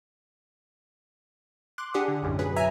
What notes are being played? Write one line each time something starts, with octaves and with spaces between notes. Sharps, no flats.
C6 D6 F#6
D4 G4 G#4 F#5 D#6
D3
B1 F#2 A2
F#3 G#4 B4 B5
E5 G#5 A#5